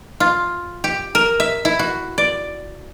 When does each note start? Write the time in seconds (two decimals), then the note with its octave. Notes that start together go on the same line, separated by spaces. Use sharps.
0.20 F4
0.84 G4
1.15 A#4
1.40 E5
1.65 E4
1.79 F#4
2.18 D5